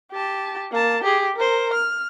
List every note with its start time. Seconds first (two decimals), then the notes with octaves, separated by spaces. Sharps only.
0.12 G4 A5
0.71 A#3 A5
1.04 G4 G#4
1.36 A#4 C5
1.74 F6